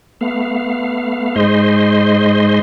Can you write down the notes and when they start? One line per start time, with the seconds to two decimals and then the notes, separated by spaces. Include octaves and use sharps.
0.21 A3 B3 F5
1.36 G#2 G#3 C5 D#5 C6